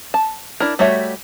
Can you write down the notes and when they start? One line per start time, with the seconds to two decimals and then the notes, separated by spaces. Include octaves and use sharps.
0.14 A5
0.60 D4 E4 A#4
0.79 G3 A3 F#4 C#5 E5